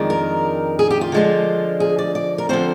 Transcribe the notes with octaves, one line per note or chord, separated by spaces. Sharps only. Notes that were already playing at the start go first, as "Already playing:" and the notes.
Already playing: F2 D#3 G#3 D4
A#4
G#4
G4
F4
D3 F3 G#3 D4
G#4
D5
D5
A#4
D3 F3 C4 C5